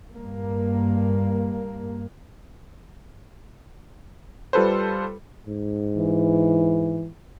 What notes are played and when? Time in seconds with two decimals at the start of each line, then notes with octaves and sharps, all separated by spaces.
0.12 G2 A#3
4.53 G3 F4 A4 B4 C5
5.47 G#2
5.97 E3